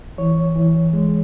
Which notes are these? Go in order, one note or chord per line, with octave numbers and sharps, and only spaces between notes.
E3 C#5
E3
G#3